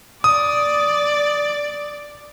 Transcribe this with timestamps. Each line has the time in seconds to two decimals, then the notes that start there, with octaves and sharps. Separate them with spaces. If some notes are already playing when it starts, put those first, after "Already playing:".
0.24 D5 D#6